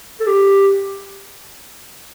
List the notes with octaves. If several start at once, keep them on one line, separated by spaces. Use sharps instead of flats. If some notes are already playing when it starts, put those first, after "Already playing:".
A4
G4